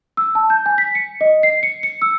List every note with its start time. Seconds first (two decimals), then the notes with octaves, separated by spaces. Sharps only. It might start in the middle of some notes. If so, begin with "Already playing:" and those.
0.17 E6
0.35 A5
0.50 G6
0.66 G#5
0.78 B6
0.95 C#7
1.21 D#5
1.43 C7
1.63 C#7
1.83 C#7
2.02 E6